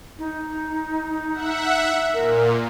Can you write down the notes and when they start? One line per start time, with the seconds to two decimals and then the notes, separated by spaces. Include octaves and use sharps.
0.19 D#4
1.32 E5 F#5
2.14 A#2 A#4